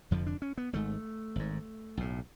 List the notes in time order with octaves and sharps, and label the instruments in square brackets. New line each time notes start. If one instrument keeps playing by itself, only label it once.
[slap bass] F1 F2 D3 F3
D4
C#4
B3
G#1 G#2 A3
G#1 G#2
B1 A2